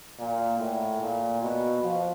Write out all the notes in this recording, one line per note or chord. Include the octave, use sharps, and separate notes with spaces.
A#2
A2
A#2
B2
F3